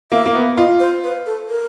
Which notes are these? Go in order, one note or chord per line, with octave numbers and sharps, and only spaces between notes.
A#3 E5
A#3
B3
F4 D#5
C5
B4
A4
A#4